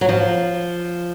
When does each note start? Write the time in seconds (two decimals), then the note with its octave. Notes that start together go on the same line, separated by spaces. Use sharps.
0.01 F#3
0.09 F3